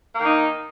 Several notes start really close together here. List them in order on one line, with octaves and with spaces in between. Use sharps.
A#3 D#3 D#4